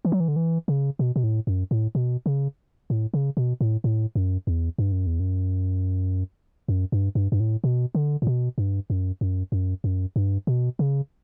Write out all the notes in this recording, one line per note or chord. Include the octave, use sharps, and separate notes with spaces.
E3
F#3
E3
D3
E3
C#3
B2
B2
A2
F#2
A2
B2
C#3
A2
C#3
B2
A2
A2
F#2
E2
G2
F#2
E2
F#2
F#2
G2
G2
G2
A2
B2
D3
A2
B2
G2
F#2
F#2
F#2
F#2
G2
B2
C#3